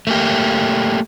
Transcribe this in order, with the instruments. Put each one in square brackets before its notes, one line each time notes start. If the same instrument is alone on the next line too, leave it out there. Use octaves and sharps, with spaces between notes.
[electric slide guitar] A3 A#3 G4